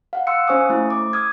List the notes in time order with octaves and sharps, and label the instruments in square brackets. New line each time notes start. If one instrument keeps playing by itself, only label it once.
[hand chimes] F5 F#5
F5 C6 E6 F#6 C#7
C#4 C5 G#5 C#6 D#6
A3 E4
D6
D#6 F6 G#6